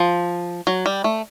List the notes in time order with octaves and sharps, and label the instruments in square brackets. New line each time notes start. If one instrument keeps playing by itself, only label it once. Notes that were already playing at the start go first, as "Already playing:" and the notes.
Already playing: [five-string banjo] F3
F#3
G3
A3